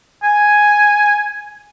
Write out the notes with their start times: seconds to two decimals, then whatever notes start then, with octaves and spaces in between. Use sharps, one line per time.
0.23 G#5